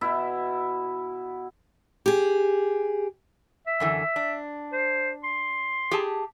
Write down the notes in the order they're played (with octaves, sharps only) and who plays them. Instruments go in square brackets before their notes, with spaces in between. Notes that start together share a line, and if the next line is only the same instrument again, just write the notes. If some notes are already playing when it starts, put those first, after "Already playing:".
[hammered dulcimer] B2 E4 E5
[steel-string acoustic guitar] G4 G#4
[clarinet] E5
[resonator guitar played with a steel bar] F#2 D3 E3
D4
[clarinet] C5
C6
[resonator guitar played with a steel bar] G4 G#4 A5